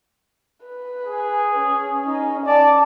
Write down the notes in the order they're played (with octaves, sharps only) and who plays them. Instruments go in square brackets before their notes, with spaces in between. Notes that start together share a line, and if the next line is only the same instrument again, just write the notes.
[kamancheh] B4
[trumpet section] G#4
[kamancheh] C#4
C#4 D#4
[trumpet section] D5 [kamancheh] A5